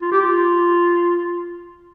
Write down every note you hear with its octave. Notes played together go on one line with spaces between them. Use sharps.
F4
G4
F4